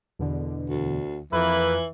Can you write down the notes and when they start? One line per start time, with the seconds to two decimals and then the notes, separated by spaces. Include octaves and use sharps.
0.19 E2 B2 D3
0.70 D2
1.32 F2 E3 A#3 E4 B4